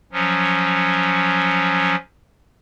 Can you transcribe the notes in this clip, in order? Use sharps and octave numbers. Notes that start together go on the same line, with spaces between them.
F3 F#3 C#4